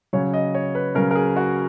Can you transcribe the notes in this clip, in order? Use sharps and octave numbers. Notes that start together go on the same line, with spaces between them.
C#3 F#3 C#5
D#5
C#5
B4
C#3 F#3 A#4
A#4
G#4
F#4